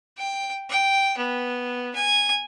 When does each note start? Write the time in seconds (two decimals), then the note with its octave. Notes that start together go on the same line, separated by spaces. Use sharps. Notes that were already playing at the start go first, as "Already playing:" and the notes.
0.18 G5
0.70 G5
1.17 B3
1.95 G#5